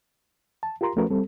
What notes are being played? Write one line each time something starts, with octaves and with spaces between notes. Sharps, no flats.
A5
F4 G4 A#4 A#5 C6
F3 A3 C#4 F#4 A#4 B4
G3 C4 A4